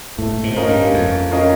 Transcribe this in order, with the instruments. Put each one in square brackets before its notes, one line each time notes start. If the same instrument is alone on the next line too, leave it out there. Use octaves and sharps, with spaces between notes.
[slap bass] A2 [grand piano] A3
[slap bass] G#2
[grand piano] C#4 F4 A#4 D#5
[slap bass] G2
[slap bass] F2 [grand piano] A3
[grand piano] C#4 F4 A#4 D#5